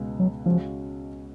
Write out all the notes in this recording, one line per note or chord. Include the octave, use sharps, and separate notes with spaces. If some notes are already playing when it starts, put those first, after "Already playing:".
Already playing: C#2 B2 G#3
F#3
C#2 C#3 F3 G#3 C#4 F#4